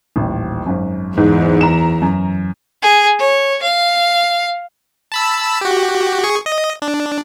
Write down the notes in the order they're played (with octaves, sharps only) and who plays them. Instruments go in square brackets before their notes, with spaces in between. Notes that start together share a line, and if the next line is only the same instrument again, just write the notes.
[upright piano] D#1 A1
G#1 F#2
[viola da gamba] E2 [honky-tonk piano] G#2
[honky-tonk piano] A#5 E7
[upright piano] F#2
[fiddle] G#4
C#5
F5
[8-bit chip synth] A5 B5 E6
F#4 G4
G#4 C#6
D#5
D4